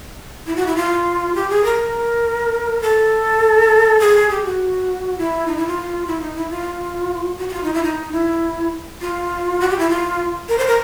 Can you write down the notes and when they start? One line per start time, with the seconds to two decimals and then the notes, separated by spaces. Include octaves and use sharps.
0.46 E4
0.56 F#4
0.66 E4
0.76 F4
1.35 G4
1.49 G#4
1.64 A#4
2.82 A4
4.00 G#4
4.30 G4
4.44 F#4
5.18 E4
5.47 D#4
5.57 E4
5.67 F4
6.07 E4
6.21 D#4
6.36 E4
6.50 F4
7.39 F#4
7.49 F#4
7.53 F4
7.63 D#4
7.74 E4
7.83 D#4
8.12 E4
9.01 F4
9.60 F#4
9.70 G4
9.79 E4
9.90 F4
10.49 A#4
10.58 C5
10.67 A#4